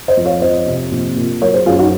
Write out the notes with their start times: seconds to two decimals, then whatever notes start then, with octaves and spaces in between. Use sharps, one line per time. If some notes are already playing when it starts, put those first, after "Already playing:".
0.08 C5 D#5
0.17 F2
0.25 C#5 F5
0.41 F2 C5 D#5
0.66 C3
0.92 A#1
1.17 A#2
1.41 F#3 A#4 C#5
1.54 G#4 C5
1.66 F#2 F4 G#4
1.79 D#4 F#4